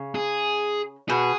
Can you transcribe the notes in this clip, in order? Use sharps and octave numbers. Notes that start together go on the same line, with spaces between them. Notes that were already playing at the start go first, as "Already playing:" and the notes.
Already playing: C#3
G#4
B2 G#4